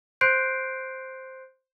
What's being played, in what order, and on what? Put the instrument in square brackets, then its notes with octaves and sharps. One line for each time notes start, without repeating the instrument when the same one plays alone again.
[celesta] C5 C6 F#6 G6 C7 D7